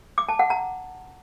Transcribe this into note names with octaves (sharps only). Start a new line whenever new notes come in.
D6
A5
F#5
A#5